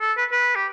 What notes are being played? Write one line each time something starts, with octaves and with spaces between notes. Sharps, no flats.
A4
B4
B4
G4